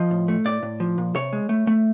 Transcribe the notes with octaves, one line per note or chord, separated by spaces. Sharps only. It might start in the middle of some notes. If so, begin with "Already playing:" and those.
Already playing: F3 D#5
A2
A3
A2 D5
A2
F3
A#2
C3 C#5
G#3
A3
A3